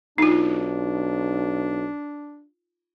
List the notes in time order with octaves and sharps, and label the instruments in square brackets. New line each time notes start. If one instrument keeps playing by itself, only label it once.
[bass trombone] B1 [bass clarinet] D4 [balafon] D#4 F4